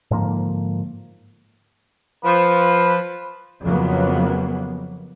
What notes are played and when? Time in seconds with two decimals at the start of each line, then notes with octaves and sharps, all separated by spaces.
0.11 G#2 D3 F3 A#3
2.24 F3 B4
3.62 F2 C#3 F#3 A#3 B3